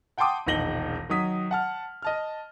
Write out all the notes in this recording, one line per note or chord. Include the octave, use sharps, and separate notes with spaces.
F#5 G5 A5 C6 D6 D#6
E1 A#1 D#3 A#6 F#7 G7
D#3 F#3 D#6 B6
F#5 A5 F6
D#5 A5 F6